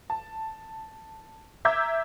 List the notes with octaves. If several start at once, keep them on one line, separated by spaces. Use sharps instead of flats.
A5
E5 A#5 D6 E6 G6 G#6